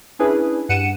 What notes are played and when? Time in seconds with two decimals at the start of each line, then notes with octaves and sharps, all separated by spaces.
0.19 C#4 D4 E4 G#4 B4
0.69 G2 F#5 C#7 D#7 E7